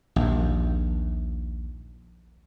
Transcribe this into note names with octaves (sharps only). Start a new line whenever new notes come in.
A#1 D#2